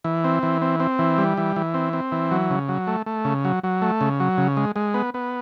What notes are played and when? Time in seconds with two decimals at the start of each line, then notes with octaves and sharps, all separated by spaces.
0.04 E3
0.24 C4
0.43 E3
0.62 C4
0.80 C4
0.99 E3
1.18 G3
1.38 E3
1.56 E3
1.74 C4
1.93 C4
2.12 E3
2.31 F#3
2.50 C#3
2.69 F#3
2.87 A3
3.06 A3
3.25 C#3
3.45 F#3
3.64 F#3
3.82 A3
4.01 C#3
4.20 F#3
4.38 C#3
4.57 G#3
4.76 G#3
4.94 B3
5.14 B3